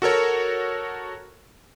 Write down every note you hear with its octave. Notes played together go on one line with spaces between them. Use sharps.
F#4 A4 A#4 C#5